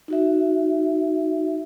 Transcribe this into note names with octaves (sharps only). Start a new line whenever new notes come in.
D#4 F#4 E5